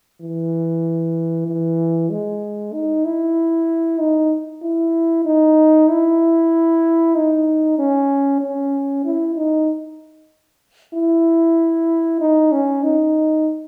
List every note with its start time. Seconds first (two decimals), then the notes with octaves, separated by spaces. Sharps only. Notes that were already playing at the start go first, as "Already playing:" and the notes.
0.21 E3
1.47 E3
2.10 G#3
2.73 D#4
3.05 E4
4.00 D#4
4.63 E4
5.26 D#4
5.90 E4
7.16 D#4
7.79 C#4
8.41 C#4
9.05 E4
9.36 D#4
10.94 E4
12.21 D#4
12.52 C#4
12.83 D#4